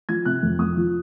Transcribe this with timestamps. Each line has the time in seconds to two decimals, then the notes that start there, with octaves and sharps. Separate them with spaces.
0.09 F3 G#6
0.25 C3 F#6
0.43 F2
0.59 F2 D#6
0.77 F3